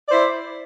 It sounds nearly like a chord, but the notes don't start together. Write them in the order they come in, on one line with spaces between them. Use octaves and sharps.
D5 C5 E4